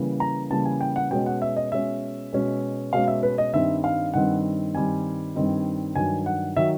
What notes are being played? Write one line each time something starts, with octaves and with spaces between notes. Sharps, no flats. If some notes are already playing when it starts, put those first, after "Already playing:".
Already playing: C#3 E3 G3 A#3
A#5
C#3 E3 G3 A#3 A5
G#5
G5
F#5
B2 G#3 C#4 G5
F#5
E5
D#5
B2 G#3 C#4 E5
B2 G#3 C#4
B2 G#3 C#4 F5
E5
B4
D#5
G2 D#3 G3 C4 D#4 E5
F5
G2 D#3 G3 C4 D#4 F#5
G2 D#3 G3 C4 D#4 G#5
G2 D#3 G3 C4 D#4
G2 D#3 F#3 G#5
F#5
D#3 F#3 E5